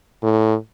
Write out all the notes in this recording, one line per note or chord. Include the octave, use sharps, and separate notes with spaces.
A2